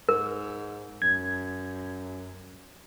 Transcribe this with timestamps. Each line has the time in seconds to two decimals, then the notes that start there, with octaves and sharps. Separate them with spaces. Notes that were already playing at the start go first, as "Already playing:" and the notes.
0.09 G#2 A#4
1.02 F#2 G#6